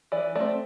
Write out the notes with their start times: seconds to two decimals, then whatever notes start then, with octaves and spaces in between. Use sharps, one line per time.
0.12 E3 D5
0.35 A3 C4 D5